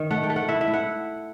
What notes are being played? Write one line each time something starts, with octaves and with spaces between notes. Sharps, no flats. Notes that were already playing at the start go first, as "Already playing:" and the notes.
Already playing: D#3
A3 F#5
G5
A3
F#5
E4 E5
E5
E4
F#5